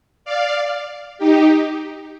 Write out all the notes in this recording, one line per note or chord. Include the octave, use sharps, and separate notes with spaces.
D5 F5
D#4 G4